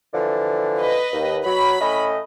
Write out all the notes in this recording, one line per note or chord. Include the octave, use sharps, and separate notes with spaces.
D3 E3 F3
B4 D#5
D#2
F#3 B5
A2 C#4 D#5